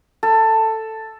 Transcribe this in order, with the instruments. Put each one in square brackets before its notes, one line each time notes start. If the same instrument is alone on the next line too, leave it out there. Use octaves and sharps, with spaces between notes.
[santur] A4